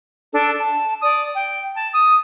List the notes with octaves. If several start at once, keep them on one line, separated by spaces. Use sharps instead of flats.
D4 A4
A5
D5 D#6
G5
A5
D#6